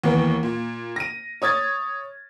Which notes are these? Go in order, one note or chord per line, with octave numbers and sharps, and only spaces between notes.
D#2 E3 A#3 B3
A#2
A#6 D#7
C#5 D#6 G#6 A6